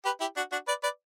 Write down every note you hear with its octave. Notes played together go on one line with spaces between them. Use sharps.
G4 B4
E4 G4
D4 F#4
D4 F#4
B4 D5
B4 D5